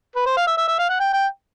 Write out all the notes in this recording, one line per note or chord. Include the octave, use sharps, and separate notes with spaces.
B4
C5
F5
E5
E5
E5
F5
F#5
G5
G5